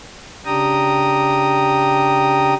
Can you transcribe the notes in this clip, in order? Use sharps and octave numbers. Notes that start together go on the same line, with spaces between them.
C#3 D4 G4 G5 A#5 D#6